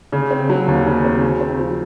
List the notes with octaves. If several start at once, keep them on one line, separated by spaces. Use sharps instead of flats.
C#3
C4
F#3
D#2
C#3
C4
C#3
C4
F3